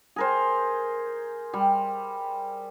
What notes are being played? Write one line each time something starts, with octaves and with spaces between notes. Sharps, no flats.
G#4 A#4 C5
G3